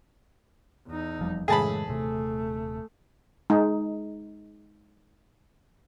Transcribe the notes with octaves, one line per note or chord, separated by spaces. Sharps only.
E2 D#4
F1 F3 G3
F#2 A2 C#3 E3 G#3 G#4 A5 B5
D#1 C3 A3
G#3 D#4